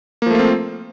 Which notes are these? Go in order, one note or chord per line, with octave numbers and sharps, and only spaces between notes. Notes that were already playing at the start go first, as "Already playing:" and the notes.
F3 A3 A#3 C4 F4